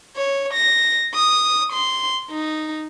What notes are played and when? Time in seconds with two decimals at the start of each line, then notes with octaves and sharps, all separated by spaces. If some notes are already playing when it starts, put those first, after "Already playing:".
0.16 C#5
0.54 A#6
1.14 D#6
1.73 C6
2.31 D#4